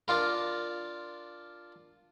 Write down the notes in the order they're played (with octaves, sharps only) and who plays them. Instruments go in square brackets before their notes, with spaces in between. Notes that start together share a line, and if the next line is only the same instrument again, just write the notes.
[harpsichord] D4 F4 A#4